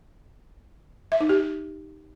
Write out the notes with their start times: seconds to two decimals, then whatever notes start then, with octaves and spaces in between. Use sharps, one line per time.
1.12 E5
1.21 D#4
1.29 G4